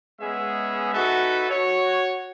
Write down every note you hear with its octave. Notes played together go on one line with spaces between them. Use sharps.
G#3 B3 C#4 G#4 E5
D#4 F#4 A4 B4 E5
F#4 C#5